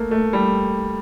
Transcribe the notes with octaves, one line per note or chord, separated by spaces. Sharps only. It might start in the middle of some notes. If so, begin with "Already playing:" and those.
Already playing: A3 A#3
A3
G3